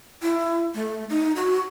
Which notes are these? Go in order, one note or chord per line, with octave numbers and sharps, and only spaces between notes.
E4
A3
D#4
F#4